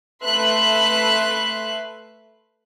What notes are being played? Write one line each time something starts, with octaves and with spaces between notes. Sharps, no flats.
A3 B4 E5 C6 F#6